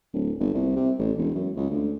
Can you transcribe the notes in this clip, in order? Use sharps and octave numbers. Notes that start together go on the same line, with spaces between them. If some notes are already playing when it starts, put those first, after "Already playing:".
D1
G1
C2
C3
A1
E1
F#2
C#2
D2